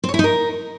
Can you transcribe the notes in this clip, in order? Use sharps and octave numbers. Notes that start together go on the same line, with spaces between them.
C4
C#5
E4
D#4
A#4